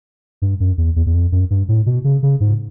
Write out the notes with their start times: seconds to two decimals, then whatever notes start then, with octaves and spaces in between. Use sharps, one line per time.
0.42 G2
0.60 F#2
0.78 E2
0.96 E2
1.06 E2
1.14 F2
1.32 F#2
1.50 G2
1.68 A2
1.86 B2
2.04 C#3
2.23 C#3
2.40 G#2